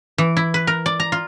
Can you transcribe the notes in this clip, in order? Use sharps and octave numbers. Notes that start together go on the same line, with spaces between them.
E3
E4
B4
A#4
D5
A#5
F4